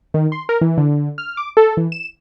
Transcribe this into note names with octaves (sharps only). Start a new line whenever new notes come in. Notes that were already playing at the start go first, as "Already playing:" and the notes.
D#3
C6
A#4
E3
D3
F6
D6
A4
E3
E7